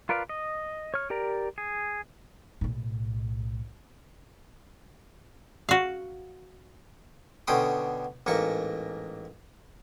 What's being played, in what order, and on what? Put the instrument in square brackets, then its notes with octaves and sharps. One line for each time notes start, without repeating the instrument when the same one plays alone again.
[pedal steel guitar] F4 A#4 B4 D5 F5
D#5
C#5 F6
G4 A#4 D5 A#5
G#4
[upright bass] B1 A2
[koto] F#4 F5
[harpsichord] B2 D3 C#4 G5 C6 D#6
A1 G#2 A#3 C#6